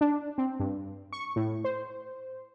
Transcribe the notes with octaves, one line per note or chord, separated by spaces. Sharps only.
D4
C4
G2
C#6
A2
C5